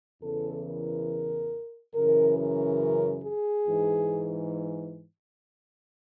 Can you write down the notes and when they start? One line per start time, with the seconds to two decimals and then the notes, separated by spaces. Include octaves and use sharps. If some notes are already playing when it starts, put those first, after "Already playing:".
0.21 E2 C#3 E3 A4
0.65 A#4
1.94 F#2 C#3 E3 A#4
2.38 A#4
3.24 G#4
3.67 G#2 E3